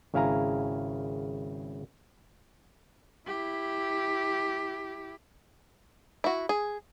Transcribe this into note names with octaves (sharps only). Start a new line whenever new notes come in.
G#1 C#3 E4 F5 G#5 A#5
E4 G4
E4 F#4
G#4